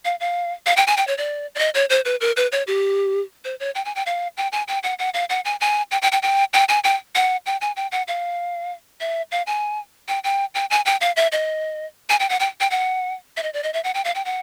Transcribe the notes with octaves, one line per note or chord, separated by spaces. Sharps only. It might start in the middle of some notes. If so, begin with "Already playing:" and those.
F5
F5
F5
G5
G#5
G5
C#5
D5
D5
D#5
C#5
C5
B4
A#4
B4
C#5
G4
C5
C#5
G5
G#5
G5
F5
G5
G#5
G5
F#5
F#5
F5
F#5
G#5
G#5
G5
G5
G5
G5
G5
G#5
G5
F#5
G5
G#5
G5
F#5
F5
E5
F5
G#5
G5
G5
G5
G#5
G5
F5
E5
D#5
G#5
G5
F#5
G5
G5
F#5
E5
D#5
D5
D#5
E5
F#5
G5
F5
G5
F#5